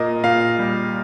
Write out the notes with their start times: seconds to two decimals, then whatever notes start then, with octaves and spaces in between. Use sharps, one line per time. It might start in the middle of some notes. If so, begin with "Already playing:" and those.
Already playing: A#2 A#3 D#5
0.24 A#2 F5
0.59 G3